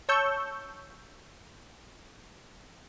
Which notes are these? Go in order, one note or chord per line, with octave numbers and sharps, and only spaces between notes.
C#5 A5 C#6 E6 G6